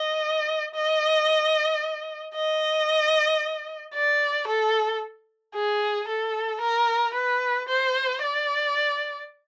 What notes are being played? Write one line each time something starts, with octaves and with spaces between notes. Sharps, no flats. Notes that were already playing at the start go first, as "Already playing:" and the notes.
Already playing: D#5
D#5
D#5
D5
A4
G#4
A4
A#4
B4
C5
D5